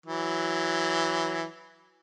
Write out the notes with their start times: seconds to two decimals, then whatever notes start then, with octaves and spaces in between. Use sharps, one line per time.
0.06 E3 F#3